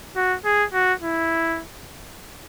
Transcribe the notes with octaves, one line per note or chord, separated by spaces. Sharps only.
F#4
G#4
F#4
E4